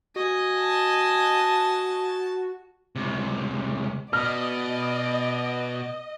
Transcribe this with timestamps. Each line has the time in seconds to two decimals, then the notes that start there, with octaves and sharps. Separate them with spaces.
0.16 F#4 D#5 G#5
0.59 A5
2.96 C#2 C3
4.13 B2 D5 D#5 F6